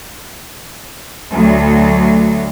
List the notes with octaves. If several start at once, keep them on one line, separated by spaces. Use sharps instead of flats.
D2 F#3